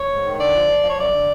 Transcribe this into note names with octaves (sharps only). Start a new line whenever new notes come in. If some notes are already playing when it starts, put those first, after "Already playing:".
Already playing: C#5
G#2
D#3
D3 D5
F3
F3
F3
C#5
F#2 D5
D3